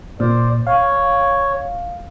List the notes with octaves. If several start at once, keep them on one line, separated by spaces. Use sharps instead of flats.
A#2 C5 D5
C#5 F5